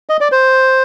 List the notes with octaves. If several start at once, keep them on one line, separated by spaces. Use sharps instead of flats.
D#5
D5
C5